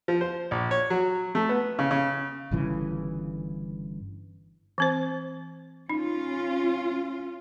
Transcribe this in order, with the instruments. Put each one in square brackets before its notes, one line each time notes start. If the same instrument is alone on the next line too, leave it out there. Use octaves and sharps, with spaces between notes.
[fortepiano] F3
C5
A#1
C#5
F#3
A3
B3
C#3
C#3
[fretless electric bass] G1 G2 C#3 E3
[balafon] E3 C4 C5
[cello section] C#4 F4 [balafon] D#4